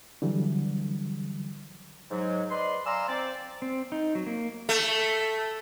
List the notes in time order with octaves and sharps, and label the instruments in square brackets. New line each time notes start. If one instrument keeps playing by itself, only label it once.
[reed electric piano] D3 E3 F#3 G3
[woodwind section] G#2 F#3
B4 D5 D#5 C6
D5 F5 G#5 A#5 C6 E6
C4 D5
[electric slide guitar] C4
D#4
F#3
A#3
[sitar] A3